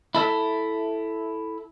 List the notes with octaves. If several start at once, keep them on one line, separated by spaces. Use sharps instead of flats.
E4 A4 E5